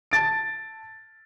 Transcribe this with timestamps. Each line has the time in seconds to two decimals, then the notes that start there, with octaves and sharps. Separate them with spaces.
0.11 A5 A6 D7